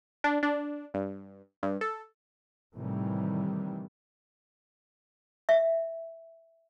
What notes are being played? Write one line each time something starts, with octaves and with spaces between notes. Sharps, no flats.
D4
D4
G2
G2
A4
A2 C3 D#3 E3 G3
E5